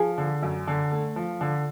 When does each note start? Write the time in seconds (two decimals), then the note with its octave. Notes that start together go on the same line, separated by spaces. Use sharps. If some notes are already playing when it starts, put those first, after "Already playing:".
Already playing: F3 G#4
0.18 D3
0.43 F#2
0.68 D3
0.92 A3
1.16 F3
1.41 D3